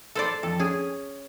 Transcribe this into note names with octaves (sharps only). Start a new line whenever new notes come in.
A4 C5 D5
F2 A4
C#4 G#4